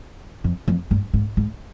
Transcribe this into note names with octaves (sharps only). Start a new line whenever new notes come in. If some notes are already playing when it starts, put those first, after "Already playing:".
F2
F2
G2
G#2
G#2